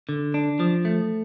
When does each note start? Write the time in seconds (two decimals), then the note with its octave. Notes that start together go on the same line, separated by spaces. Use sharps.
0.09 D3
0.34 D4
0.60 F3
0.85 A3